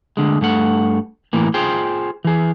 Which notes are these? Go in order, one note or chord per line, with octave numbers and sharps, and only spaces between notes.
D2 G2 D3 G#3
G2 A3 F#5
A2 E3 A#3
F4 G#4 C5 G5
E3 G#4